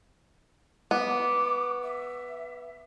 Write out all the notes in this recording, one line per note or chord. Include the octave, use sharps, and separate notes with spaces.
B3 D6
E5